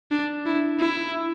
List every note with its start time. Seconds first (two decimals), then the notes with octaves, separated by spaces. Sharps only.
0.11 D4
0.46 E4
0.79 E4